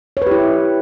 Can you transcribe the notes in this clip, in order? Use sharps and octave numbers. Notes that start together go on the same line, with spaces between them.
E4 G4 B4 C#5